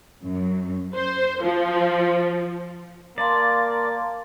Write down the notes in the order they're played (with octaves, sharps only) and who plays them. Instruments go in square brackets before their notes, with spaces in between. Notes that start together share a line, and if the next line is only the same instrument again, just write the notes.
[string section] F#2
C5
F3
[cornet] A#3 [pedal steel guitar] D5 [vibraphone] F5 A5 C6